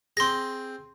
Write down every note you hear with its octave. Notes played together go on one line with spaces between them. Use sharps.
C4 G#4 C6 A#6